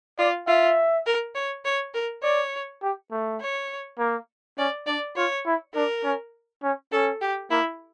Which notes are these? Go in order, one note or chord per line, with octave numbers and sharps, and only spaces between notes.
F4 D5
F4 E5
A#4
C#5
C#5
A#4
C#5 D5
G4
A3
C#5
A#3
C#4 D5
D4 D5
F4 C#5
E4
D4 A#4
C#4
C#4
C#4 A4
G4
A#3 E4